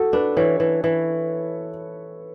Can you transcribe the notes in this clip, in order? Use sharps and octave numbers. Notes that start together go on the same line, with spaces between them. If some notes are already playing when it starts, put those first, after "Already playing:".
Already playing: F#4 A4
D4 B4
E3 C#5
E3
E3